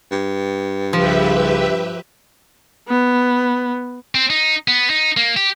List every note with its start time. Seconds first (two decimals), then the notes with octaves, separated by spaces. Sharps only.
0.11 G2
0.93 C2 C#3 F3 G4 B4 E5
2.88 B3
4.15 C4
4.30 D#4
4.68 B3
4.90 D#4
5.17 A#3
5.37 G4